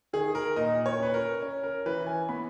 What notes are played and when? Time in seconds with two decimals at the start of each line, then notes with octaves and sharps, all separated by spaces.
0.13 D#3 G#4
0.35 A#4
0.56 A#2 D#5
0.86 C#5
0.99 C#4 B4
1.14 A#4
1.42 C#4
1.63 A#4
1.86 E3 B4
2.06 G#5
2.29 B3 B5